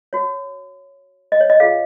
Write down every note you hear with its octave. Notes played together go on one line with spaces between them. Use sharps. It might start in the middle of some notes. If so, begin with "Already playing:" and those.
F#4 C#5
D#5
C#5
D#5
F4 G#4 C#5 F5